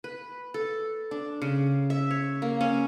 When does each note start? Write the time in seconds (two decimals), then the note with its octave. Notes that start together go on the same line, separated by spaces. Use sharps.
0.04 B4
0.54 A4
1.11 D4
1.42 C#3
1.90 E5
2.11 C#5
2.42 A#3
2.61 C#4